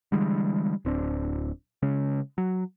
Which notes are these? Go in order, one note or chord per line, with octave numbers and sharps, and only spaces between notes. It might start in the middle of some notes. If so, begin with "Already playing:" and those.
D3 E3 G3 G#3
D1 C4 D4
C#3 G#3 C#4
F#3